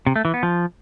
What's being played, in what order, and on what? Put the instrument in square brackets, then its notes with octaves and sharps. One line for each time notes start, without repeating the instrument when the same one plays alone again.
[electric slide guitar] C3
A3
E3
B3
F3